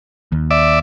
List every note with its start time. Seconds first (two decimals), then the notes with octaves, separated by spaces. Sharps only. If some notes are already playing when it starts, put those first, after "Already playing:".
0.32 D#2
0.51 D5 E5